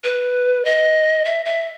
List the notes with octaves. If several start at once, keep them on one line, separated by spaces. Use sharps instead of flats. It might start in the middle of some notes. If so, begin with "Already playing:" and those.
B4
D#5
E5
E5